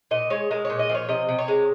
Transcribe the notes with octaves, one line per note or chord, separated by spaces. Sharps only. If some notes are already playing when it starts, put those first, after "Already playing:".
A#2 D#5
G#3 C#5
G#3 A#4
C#5
A#2
D#5
F3
C#5
C3 D#5
C3
C#5
G#3